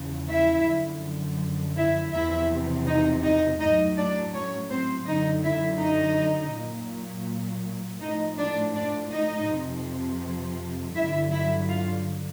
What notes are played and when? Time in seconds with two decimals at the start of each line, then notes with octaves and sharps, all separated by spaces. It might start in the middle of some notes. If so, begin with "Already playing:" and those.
Already playing: E2 C#3 F3
0.29 E4 E5
0.67 F#2 D3 F3
1.77 E4 E5
2.13 E2 C3 F3 E4 E5
2.87 D#4 D#5
3.23 D#4 D#5
3.60 A2 F#3 D#4 D#5
3.97 D4 D5
4.34 C#4 C#5
4.71 C4 C5
5.07 F#2 D3 F#3 D#4 D#5
5.44 E4 E5
5.81 D#4 D#5
6.54 A#2 F#3
8.01 A2 F3 D#4 D#5
8.38 D4 D5
8.74 D4 D5
9.11 D#4 D#5
9.48 F2 C3 F3
10.95 G2 D3 F#3 E4 E5
11.32 E4 E5
11.69 F4 F5